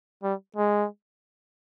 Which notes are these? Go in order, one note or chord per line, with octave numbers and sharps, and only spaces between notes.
G3
G#3